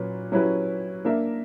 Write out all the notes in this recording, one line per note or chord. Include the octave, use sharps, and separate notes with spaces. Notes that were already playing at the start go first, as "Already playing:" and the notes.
Already playing: A#2 F#3 C#4 B4
F#3 C#4 E4 G4 B4
A#3 D4 A#4 E5